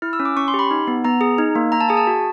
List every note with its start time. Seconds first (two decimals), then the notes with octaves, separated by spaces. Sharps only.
0.02 E4 F6
0.13 E6
0.20 C#4
0.25 D6
0.36 C#4 C#6
0.48 C6
0.54 G4
0.59 B5
0.71 D#4
0.87 B3
1.04 B3 A#5
1.21 G#4
1.38 D#4
1.55 A#3
1.72 A#3 A#5
1.81 A5
1.89 G#4 G#5
1.97 A5
2.07 F#4